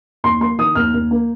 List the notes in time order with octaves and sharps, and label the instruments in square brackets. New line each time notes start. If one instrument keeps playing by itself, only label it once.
[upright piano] D#2 C6
A#3 C6
D#3 D#6
D#2 F6
D#2
A#3